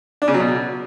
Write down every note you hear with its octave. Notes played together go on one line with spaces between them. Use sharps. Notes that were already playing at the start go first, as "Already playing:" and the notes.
D4
C#3
F#3
B2